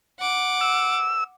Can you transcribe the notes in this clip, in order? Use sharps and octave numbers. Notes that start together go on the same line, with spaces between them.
F#5 D6
E6